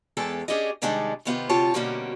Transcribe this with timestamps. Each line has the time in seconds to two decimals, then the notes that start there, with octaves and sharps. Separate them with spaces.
0.17 E2 G#3 C#4 A4 G5 A5
0.48 C#4 D4 G4 G#4 D#5
0.82 C3 D#3 G3 G#3 D4 D#4
1.25 C3 D#3 B3 F4 G4
1.49 D2 C3 F4 G4 C#5 A5
1.74 B2 D3 G3 A#3 C#4 F#4